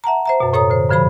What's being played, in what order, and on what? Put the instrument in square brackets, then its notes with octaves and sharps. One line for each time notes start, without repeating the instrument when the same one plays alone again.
[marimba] E5 F#5 A5 A#5
C5 E5 A#5
F#2 B2
A2 A4 C#5 A#5 D#6
D3 C5
G2 D3 F3 C5 B5